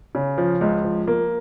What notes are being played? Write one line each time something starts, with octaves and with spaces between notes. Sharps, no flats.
C#3
F3
C#2
F3
A#3